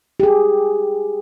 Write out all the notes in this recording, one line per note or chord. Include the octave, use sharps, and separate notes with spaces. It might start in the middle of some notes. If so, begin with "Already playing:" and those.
G4 G#4